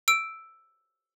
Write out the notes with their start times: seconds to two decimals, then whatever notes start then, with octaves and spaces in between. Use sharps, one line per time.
0.08 E6 D7